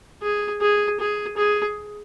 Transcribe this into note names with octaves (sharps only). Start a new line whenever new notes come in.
G#4
G#4
G#4
G#4